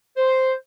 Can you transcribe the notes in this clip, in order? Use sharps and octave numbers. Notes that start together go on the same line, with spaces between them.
C5